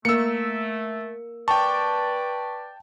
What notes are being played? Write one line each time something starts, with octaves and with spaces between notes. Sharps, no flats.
A3 A#3 A#4 E6 C#7
B4 D5 G5 A5 C#6